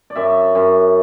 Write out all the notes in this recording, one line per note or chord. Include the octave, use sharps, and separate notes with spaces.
D5
F#2 E5
F#2